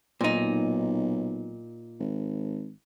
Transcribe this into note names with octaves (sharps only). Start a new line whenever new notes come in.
B1 A#2 D#4
G#1